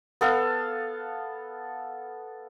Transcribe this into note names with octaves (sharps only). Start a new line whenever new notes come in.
B3 A4 F5